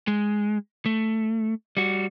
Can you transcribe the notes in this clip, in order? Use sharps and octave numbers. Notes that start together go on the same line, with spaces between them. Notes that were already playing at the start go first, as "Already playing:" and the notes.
G#3
A3
G3 F#4